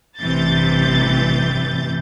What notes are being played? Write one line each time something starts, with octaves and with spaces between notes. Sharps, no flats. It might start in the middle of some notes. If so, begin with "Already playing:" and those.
A1 G2 C3 E3 G6 A6